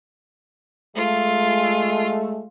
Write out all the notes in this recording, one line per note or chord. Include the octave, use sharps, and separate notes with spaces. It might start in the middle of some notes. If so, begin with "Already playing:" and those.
G#3 A3 F4